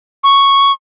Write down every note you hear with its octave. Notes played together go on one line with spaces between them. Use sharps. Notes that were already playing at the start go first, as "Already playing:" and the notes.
C#6